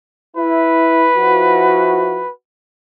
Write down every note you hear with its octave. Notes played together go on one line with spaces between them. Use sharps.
E4 B4
F3 E4 F#4